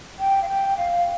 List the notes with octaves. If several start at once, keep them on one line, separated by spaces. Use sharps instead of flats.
G5
F5
G5
F5